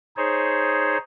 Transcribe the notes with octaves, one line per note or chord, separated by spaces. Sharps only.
D#4 G#4 C5 C#5